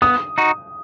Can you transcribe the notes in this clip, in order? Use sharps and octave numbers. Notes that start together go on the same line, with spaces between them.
B3 D#6
D#4 F#4